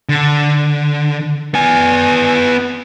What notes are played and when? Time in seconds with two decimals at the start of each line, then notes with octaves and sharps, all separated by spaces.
0.09 D3
1.54 B3 G#5